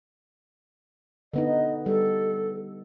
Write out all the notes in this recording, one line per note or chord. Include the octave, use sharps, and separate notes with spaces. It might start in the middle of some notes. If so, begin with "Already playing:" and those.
D3 B3 D#4 D#5
G3 A4